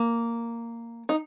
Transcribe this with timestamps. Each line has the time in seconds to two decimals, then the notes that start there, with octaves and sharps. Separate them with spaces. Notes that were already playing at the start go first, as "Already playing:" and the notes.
Already playing: A#3
1.09 D#4